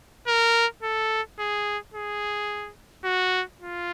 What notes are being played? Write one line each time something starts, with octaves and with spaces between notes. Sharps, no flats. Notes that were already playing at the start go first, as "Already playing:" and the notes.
A#4
A4
G#4
G#4
F#4
F4